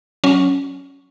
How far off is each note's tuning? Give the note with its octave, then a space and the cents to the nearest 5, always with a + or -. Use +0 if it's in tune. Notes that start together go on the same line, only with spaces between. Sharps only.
F#3 +0 C#4 +0